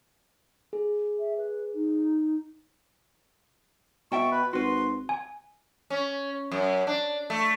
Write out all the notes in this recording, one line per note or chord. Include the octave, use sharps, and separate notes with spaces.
G#4
E5
B4
D#4
B2 E5 G5 A5 C#6
B4
G#1 F#4 B4 C6
G#5
C#4
F#2
D4
A3